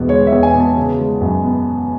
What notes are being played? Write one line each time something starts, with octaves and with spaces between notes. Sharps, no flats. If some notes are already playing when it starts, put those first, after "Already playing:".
Already playing: E1 E2 B2
G#3 C#5
E5
E2
G#5
B2
A5
C#3
G#3
F#2
B3